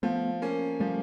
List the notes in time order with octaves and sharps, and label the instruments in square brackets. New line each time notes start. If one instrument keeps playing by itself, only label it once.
[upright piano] F3 [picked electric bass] A3 B3
[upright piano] A#3 C#4
[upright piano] F3 [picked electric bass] G3 A3